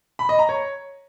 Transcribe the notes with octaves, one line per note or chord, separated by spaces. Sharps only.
B5
D#5
A#5
C#5